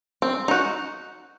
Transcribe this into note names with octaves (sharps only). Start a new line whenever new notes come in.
C4
D#4 F#4